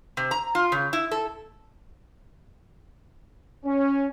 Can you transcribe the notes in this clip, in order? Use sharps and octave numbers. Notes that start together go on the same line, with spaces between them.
C3
A#5
F4
C#3
E4
A4
C#4